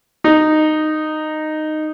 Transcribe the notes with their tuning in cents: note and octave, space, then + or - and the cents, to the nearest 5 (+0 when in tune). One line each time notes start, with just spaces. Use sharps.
D#4 -10